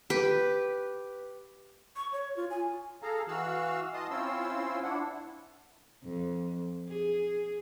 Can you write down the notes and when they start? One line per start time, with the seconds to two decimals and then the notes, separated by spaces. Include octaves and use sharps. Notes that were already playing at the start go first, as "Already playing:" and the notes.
0.10 G4 B4
1.96 C#6
2.12 C#5
2.37 F4
2.50 G#5
3.03 G#4 A4 F5 A#5
3.28 E3 F#4 F5 E6 F#6
3.94 D#5 A5 C6 D#6
4.11 C4 C#4 E4 F4 C6 E6
4.83 D4 E4 F#5
6.04 F2
6.88 G#4